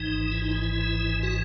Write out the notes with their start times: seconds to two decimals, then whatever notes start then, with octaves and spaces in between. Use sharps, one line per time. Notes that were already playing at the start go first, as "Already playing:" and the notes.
Already playing: G#1 G#2 E3 D#4
0.32 E4
0.42 D#4
0.51 E4
1.23 F#4